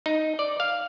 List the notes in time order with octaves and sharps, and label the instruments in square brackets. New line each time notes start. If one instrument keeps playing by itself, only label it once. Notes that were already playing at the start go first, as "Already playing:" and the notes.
[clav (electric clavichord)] D#4
D5
F5